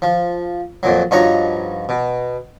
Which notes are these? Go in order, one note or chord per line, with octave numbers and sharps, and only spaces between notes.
F3
F2 A#2 F#3
G2 F3 D#4 F#4 C#5 A#5
B2